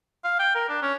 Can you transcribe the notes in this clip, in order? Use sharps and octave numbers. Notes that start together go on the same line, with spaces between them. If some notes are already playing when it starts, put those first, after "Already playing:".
F5
G5
A#4
D4
C#4